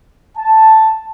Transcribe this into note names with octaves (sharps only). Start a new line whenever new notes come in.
A5